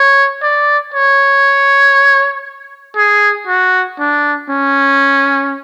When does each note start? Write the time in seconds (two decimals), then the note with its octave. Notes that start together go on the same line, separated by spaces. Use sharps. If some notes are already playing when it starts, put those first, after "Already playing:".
Already playing: C#5
0.42 D5
0.94 C#5
2.96 G#4
3.47 F#4
3.98 D4
4.49 C#4